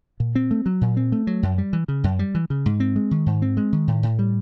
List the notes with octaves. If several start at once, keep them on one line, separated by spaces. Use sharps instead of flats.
A#2
C4
A3
F#3
A#2
C4
A3
F#3
F#2
G3
E3
C#3
F#2
G3
E3
C#3
G#2
C4
G#3
D#3
G#2
C4
G#3
D#3
A2
A2
G3